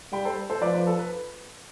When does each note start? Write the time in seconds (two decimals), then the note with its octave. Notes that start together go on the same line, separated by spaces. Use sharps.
0.12 G3 G5 B5
0.25 A4 C5
0.50 A4 C5
0.61 F3 B4 D5
0.74 B4
0.87 A4
0.99 B4